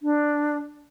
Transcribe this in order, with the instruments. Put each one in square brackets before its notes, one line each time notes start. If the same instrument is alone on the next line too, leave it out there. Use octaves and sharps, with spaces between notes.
[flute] D4